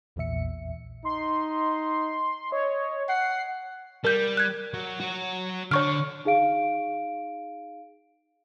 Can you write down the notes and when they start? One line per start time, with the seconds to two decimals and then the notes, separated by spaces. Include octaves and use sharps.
0.16 A#1 E2 A#2 E5 C#7
1.05 D#4 C6
2.52 C#5 D#5
3.09 F#5 C7
4.04 G3 A#4 G6
4.37 F#6 G#6
4.74 F#3
5.00 F#4 C#5
5.71 D3 C#5 C#6 F6
6.25 D#4 G#4 F5 D7